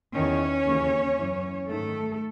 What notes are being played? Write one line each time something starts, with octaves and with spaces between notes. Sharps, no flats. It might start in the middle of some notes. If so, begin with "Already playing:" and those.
E2 D#3 C#4 C#5
D#2 C#3 E3
F#2 E3
G#2 D#3 A3 A4